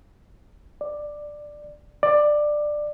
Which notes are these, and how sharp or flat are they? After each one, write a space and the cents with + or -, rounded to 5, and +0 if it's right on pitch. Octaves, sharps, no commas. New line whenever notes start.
D5 +10
D5 +15